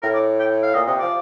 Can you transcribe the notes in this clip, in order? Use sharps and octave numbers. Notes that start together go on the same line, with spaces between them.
A2 A#4
D5
G5
F5
A#2 D#5
C3 D#5
F3 D5